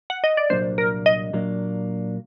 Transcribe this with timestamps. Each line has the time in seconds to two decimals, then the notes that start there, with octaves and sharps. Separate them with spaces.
0.10 F#5
0.24 D#5
0.37 D5
0.50 C2 A#2 F#3 A#3 D4 C5
0.78 A#4
1.06 D#5
1.33 A#2 F#3 A#3 D4